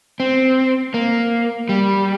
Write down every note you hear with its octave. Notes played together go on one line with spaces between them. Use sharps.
C4
A#3
G3